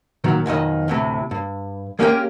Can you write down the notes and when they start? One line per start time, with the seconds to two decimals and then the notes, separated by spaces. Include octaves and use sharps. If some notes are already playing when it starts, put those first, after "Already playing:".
0.24 A#2 D#3 F#3
0.46 B1 F2 D#3 D#5
0.88 D2 A2 C3
1.31 G2
1.99 G#3 A#3 C#4 G4 A#4 G5